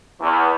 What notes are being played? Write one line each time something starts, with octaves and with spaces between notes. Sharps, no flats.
E2